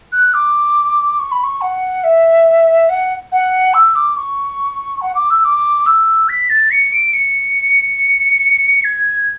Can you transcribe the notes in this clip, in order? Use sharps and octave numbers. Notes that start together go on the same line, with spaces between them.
F#6
D6
C#6
B5
C#6
F#5
E5
F#5
F#5
E6
D6
C#6
F#5
D6
E6
D6
E6
B6
A6
C#7
D7
C#7
G#6